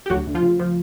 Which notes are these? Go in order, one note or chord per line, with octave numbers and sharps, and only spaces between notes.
G4
D2 F#3 F#4
D2
F3 F4
C#3
F3